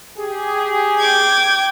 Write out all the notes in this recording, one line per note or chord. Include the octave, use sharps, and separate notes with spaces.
G4 G#4
G5 D6 G#6